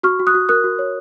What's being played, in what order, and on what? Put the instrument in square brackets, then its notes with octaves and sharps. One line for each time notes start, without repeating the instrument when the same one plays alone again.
[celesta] F#4 C#6 F6
F#4
D#6 F#6
F#4
A#4 D#6 F#6
F#4
C#5